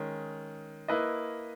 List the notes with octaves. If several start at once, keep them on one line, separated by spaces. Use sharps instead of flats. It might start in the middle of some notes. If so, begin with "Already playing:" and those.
Already playing: D#3 G#3 C#4
A#3 E4 B4 D#5